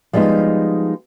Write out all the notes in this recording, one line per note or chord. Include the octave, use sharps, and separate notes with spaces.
F3 G3 G#3 B3 D#4